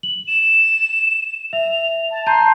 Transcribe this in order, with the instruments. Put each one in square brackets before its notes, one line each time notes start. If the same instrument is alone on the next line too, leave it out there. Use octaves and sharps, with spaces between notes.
[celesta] F#7
[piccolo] E7
[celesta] E5 [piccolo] F7
[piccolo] A5
[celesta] A5 A#5 G6 [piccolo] C6